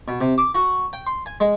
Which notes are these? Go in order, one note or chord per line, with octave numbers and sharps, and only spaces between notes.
B2
C3
D6
F#4
G5
C6
G#5
G#3